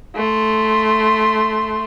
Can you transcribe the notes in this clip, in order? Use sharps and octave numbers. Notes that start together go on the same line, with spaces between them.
A3 C6